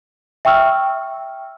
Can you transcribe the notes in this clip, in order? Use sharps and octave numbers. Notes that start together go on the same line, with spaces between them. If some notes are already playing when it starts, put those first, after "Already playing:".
E5 G5 C#6 E6 F6